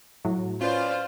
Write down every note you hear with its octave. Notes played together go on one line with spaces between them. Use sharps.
A2 F#3
C#4 F4 B4 C5 D5 F5